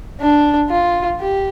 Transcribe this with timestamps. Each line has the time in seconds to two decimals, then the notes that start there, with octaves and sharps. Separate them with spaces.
0.20 D4
0.70 F4
1.20 G4